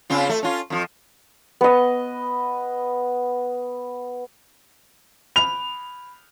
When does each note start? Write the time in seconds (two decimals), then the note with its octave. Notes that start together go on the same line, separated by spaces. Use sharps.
0.10 C#3 C4 F4
0.29 A3
0.43 C#4 F4
0.70 F2 F3
1.61 B3 D#5
5.36 B5 F7